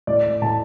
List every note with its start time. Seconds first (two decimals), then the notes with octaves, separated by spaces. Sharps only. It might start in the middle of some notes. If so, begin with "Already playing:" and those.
0.07 A2 D5
0.42 A2 A5